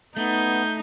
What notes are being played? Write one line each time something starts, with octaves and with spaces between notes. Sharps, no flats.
A3 B3 D#4 G6